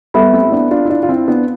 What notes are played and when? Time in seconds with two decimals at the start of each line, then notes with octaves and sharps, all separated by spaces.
0.14 G3 B3 A4 E5 B5
0.33 A3 C4
0.47 E4
0.52 B3 D4
0.71 D4 F4
0.85 E4
0.90 D4 F4
1.03 F4
1.09 C4 E4
1.28 B3 D4